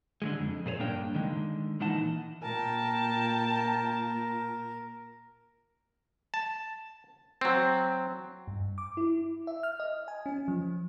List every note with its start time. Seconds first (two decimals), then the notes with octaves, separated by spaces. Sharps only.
0.22 D3 F3 G#3
0.40 F2
0.66 A#2 G#4 C5 C#5
0.79 G2 A#3 D4 A#4 G5
1.15 D3 D#3 G#3
1.80 A#2 D#3 E3 D#4 F#5 A5
2.43 A#2 A#4 G5 A5
6.34 A5
7.41 F#3 C4
8.48 G2
8.78 D6
8.97 E4
9.47 E5
9.63 F6
9.80 D#5
10.08 G#5
10.26 C#4
10.48 F3